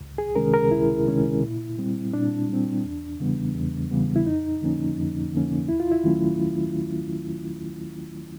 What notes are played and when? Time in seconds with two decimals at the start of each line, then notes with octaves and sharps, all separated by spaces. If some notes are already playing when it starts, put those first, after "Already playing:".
0.01 C#2
0.18 G#4
0.36 C3 D#3 G#3 C#4 A#4
0.54 A#4
0.71 C#2 E4
1.07 C3 D#3 G#3 C#4
1.42 A#2
1.78 G3 C4
2.13 A#2 D4
2.49 G3 C4
2.84 E2
3.20 C#3 E3 G3 B3
3.55 E2
3.91 C#3 E3 G3 B3
4.16 E4
4.26 F2 D#4
4.62 D3 F3 A#3 C#4
4.98 F2
5.33 D3 F3 A#3 C#4
5.69 D#2 E4
5.80 F4
5.91 E4
6.04 D#3 F#3 A3 C#4